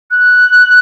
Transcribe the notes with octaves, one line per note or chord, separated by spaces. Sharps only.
F#6